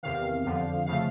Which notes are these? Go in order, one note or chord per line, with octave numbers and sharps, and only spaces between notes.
E2 C3 D#3 F5
F2 D3 F3
C#3 F3 A3 F5